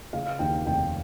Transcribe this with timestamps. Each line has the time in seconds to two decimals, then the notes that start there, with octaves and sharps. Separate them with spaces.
0.13 C#3 F5
0.39 D#2 G5
0.65 F1 G5